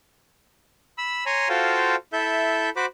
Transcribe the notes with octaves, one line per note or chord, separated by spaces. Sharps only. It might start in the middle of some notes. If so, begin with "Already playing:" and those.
B5 E6
C#5 G#5 A#5 C6
F4 F#4 A4 C5 F5 G5
E4 A4 E5 G6
F#4 C5 B5 D6 F#6